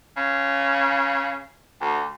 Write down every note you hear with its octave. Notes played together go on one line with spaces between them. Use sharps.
C#3
D2